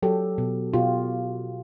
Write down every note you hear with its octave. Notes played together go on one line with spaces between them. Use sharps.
F#3 G4 A4
B2
B2 F4 G4